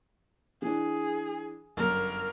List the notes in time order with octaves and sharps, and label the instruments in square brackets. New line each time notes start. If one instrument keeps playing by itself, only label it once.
[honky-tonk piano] E3 D4 [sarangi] G#4
[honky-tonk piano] G1 F#2 [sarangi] A#4